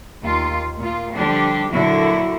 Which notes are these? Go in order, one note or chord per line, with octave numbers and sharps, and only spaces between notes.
D#2 F4
A#2 F4
D3 F3 G3 D4 G4
A#2 D3 F#3 E4 F#4